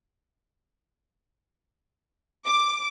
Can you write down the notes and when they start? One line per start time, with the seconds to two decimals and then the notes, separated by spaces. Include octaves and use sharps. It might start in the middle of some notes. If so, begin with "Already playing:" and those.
2.46 D6